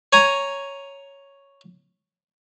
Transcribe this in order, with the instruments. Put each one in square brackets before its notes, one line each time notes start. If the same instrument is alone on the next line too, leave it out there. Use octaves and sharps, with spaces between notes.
[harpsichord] C#5 G#5 A#5